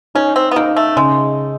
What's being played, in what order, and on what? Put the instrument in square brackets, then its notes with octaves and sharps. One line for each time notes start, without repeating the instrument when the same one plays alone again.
[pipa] C#4 [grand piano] D#4
[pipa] C4
B3
[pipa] A#3 [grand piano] D#4
[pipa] A3
[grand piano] C#3 [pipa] G#3